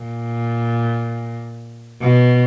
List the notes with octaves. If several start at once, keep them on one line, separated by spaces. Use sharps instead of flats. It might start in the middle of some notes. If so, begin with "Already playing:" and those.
Already playing: A#2
B2